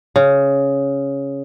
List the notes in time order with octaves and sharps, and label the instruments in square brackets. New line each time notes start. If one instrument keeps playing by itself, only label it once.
[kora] C#3